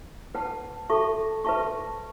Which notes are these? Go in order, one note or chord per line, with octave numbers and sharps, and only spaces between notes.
B4 F#5 A5
A4 E5 A5 C#6
B4 E5 A5 C#6